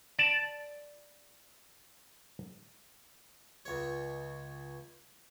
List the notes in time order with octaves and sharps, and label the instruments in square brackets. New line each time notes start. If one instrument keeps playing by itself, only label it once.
[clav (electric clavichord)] D5 A5
[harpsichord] C#2 C#5